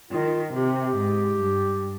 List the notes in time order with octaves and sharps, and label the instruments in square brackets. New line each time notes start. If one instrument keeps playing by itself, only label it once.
[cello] D#3 [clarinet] F4
[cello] C3 [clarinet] G4
[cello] G#2
G2